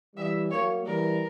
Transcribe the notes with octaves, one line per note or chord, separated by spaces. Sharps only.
E3 G3 E5
F#3 A#3 C#5
E3 G3 A#4